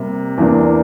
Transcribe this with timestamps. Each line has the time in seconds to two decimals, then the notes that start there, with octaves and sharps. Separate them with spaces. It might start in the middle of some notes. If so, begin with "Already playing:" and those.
Already playing: C3 G3 A#3
0.38 E2 E3 A#3 D4